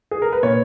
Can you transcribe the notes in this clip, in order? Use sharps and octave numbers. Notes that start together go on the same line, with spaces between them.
G#4
A#4
B4
A#2 C#5